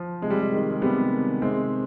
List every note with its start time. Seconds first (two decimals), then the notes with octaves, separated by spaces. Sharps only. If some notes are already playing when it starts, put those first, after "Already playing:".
Already playing: F3
0.22 C3 G#3
0.30 G3
0.40 G#3
0.52 D#3
0.59 G3
0.71 G#3
0.82 C3 G3 B3
1.12 D#3
1.42 C3 G#3 C4